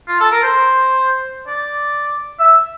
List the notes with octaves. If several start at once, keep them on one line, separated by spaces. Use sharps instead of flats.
F4
A4
A#4
C5
D5
E5